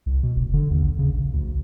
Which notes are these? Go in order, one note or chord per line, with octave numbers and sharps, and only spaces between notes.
C2
B2
F1
D3
D#2
A#1
C#3
A#1
D2